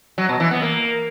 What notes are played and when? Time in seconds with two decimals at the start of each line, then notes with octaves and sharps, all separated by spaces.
0.18 F#3
0.29 B2
0.40 E3
0.51 B3
0.62 A#3